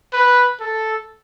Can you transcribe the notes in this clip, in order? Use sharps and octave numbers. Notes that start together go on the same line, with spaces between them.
B4
A4